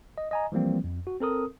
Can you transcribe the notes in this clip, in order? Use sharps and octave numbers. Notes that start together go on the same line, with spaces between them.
D#5
D#5 G#5 A#5
E3 F3 G3 A#3 C4
F2
F#4
C4 A4 A#4 D#6